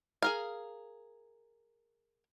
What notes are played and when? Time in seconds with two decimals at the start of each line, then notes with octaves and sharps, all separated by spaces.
0.22 G#4 A#4 F5